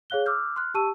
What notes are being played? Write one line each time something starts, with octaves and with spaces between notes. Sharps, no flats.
G#4 C#5 F5 F#6 G7
D6 E6 F6 G6
C6 F6 F#6
G4 A5 C#6 E6 D#7